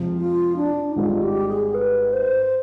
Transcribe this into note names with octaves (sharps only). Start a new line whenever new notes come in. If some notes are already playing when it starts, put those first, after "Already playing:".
Already playing: F2 C3 F3 G#3
F4
D4
D#4
G#1 G#2 G3 F4
G4
G#4
B4
C5